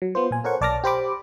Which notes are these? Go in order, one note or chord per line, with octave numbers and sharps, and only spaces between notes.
F#3
B3 F4 C5
A#2 G#5
A4 A#4 C5 C#5 F#5 C#6
B1 D5 A5 D6 F6 A#6
G4 C5 B5 D6